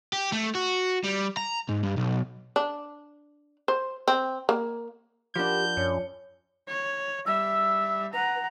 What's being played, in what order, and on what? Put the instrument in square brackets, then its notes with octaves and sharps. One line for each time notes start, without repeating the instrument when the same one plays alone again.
[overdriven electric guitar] G4
A3
F#4
G3
A#5
G#2
G2
B1
[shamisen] D4
C5
C4
A#3
[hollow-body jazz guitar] F3 D4 [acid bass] G4 [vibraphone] A#4 F#5 B5 [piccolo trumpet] G6
[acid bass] F#2 [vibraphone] C#5
[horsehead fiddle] C#5
[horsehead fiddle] G3 E5 [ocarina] E6
[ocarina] B4 [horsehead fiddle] F#5 A#5